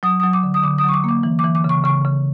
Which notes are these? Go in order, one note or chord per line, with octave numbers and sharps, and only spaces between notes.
F#3 D#6
F#3 D#6
D6
D3
D#6
D3 D6
F#3 D#6
C#6
D6
A#3 D6
E3
D6
E3
D6
C#3
C#6
C#3 C#6
C#3